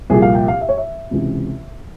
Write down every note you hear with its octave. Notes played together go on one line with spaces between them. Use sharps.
C2 A#2 F3 G#4
F5
G5
F5
E5
C#5
E5
C#2 C3 E3